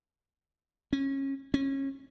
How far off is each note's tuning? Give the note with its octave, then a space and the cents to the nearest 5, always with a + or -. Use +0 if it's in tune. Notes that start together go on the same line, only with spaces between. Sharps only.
C#4 -25
C#4 -25